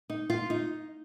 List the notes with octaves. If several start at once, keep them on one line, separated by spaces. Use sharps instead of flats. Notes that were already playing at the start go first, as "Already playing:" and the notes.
D#4
F4
D#4